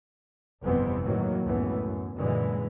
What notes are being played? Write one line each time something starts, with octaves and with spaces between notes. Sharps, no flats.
G1 F2 C3 E3 B3 C4
A2 D#3 E3 F#3 A#3
C#2 F#2 A2 E3 A3 B3
F#2
F#2 A#2 D3 E3 G#3